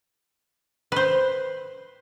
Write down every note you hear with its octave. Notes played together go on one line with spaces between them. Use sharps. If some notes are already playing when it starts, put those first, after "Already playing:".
B4 C5